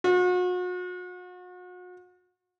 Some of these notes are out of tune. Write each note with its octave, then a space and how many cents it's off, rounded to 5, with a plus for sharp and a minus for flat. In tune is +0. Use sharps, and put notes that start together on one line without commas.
F#4 -40